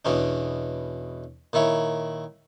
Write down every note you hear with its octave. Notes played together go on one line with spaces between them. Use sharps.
E2 B2 C#4 D4
A#2 D#3 E4 C#5